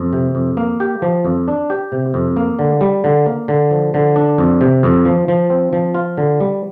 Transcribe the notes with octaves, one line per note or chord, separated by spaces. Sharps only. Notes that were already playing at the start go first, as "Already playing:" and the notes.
Already playing: F2
C3
F2
A#3
G4
F3
F2
D4
G4
C3
F2
A#3
D3
G3
D3
A#3
D3
F3
D3
D4
F2
C3
F2
F3
F3
C4
F3
F4
D3
G3